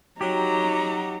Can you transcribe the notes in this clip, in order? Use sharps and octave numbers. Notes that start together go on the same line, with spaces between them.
F#3 D#4 G4 A#5